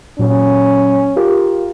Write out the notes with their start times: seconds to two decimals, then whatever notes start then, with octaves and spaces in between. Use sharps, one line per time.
0.19 A#2 F#3 C#4
1.16 F4 G4 A#4